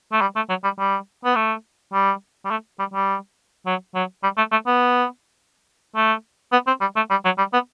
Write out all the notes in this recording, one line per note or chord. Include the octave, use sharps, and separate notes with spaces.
A3
G3
A3
F#3
G3
G3
B3
A3
G3
G3
A3
G3
G3
F#3
F#3
G3
A3
A3
B3
A3
B3
C4
G3
A3
G3
F#3
G3
B3